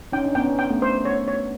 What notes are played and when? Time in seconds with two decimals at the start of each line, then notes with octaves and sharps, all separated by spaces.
0.12 C#4 D#4 G5
0.26 D4
0.35 B3 C#4 G5
0.59 G5
0.70 A3 B3
0.82 C5
1.05 C#5
1.28 C#5